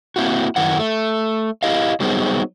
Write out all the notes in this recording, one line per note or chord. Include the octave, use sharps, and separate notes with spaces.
A#3 C4 E4 F#4
F#2 D#3 E4 F#5
A3
E4 G4 D#5 F5
F#3 G3 B3 D#4 G#4 C5